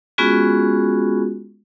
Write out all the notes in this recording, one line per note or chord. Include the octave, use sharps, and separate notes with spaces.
G#3 B3 C#4 F4 F#4 G#4